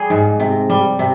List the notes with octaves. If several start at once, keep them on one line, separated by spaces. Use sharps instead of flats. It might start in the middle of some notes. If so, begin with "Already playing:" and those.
Already playing: G3 G#4
G#2
C3
G3
C3